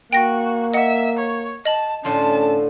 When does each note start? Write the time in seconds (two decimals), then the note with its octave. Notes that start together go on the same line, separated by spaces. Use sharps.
0.13 A#3 F#4 G5 A#6
0.74 D#5 E5 F#5
1.18 C#5
1.65 D#5 A5 F#7
2.05 A2 D3 C#4 F4 A5